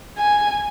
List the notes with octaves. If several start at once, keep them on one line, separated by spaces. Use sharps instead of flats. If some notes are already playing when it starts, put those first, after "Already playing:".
G#5